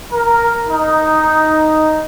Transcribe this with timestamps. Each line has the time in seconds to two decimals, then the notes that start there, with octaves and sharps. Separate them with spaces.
0.13 A#4
0.67 D#4